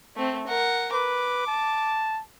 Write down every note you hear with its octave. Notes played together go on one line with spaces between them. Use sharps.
A3 C4
A#4 F#5
B4 D6
A5